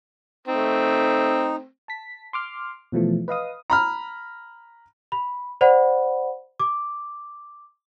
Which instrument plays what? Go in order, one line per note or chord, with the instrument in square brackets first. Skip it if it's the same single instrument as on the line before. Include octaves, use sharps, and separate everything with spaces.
[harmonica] A3 C4 [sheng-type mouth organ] D#4
[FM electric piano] A5 B6
C6 D6 F6
B2 E3 F3 A3
B4 D#5 F5 D#6
[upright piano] A#5 B5 F6
[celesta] B5
C5 D5 F#5 B5
D6